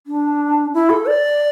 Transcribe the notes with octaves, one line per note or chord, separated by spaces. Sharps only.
D4
E4
A4
D5